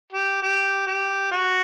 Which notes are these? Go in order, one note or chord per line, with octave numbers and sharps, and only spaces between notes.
G4
G4
G4
F#4